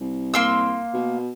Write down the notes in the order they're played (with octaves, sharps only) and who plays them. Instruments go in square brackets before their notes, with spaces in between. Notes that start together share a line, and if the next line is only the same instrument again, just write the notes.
[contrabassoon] C2
[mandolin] A#3 C6 E6
[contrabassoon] B2